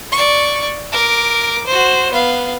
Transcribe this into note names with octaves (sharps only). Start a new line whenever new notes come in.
D5 C#6
A#4 D6
F#4 C5
B3 F5